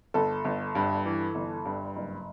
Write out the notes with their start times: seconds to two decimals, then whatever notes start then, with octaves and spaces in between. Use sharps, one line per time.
0.14 G1 A4
0.45 G1
0.75 G2
1.06 E3
1.35 G1
1.65 G2
1.96 F#1